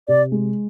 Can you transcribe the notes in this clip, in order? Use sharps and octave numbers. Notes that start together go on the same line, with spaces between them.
C3 D5
G#3